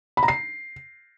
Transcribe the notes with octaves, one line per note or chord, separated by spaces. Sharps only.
B5
A#5
C7